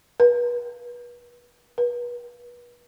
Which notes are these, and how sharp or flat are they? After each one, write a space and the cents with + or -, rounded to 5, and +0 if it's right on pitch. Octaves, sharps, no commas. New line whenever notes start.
B4 -35
B4 -35